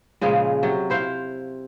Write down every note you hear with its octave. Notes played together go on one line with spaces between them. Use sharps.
A#2 C#3 F3 G#3
C3 F#3
E4 C5 F5